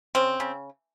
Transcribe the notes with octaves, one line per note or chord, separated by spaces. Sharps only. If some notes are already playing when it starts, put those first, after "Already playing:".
C#3 C4
C#3